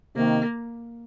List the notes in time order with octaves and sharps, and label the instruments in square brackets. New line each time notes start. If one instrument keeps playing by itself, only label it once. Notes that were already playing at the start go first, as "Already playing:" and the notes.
[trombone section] C3 D#3 [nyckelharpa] A#3